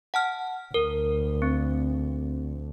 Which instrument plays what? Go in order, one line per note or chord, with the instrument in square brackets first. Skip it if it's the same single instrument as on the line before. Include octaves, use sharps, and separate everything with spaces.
[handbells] F#5 A5 F6
[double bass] D2 [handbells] A#4
[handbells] C4